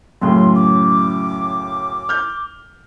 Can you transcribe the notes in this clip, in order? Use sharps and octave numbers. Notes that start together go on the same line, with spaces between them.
F#2 A2 C#3 C6
D6
F6 G6